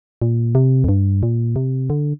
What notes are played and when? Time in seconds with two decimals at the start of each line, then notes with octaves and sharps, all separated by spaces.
0.22 A#2
0.55 C3
0.84 F2
0.89 G2
1.23 A#2
1.56 C3
1.90 D3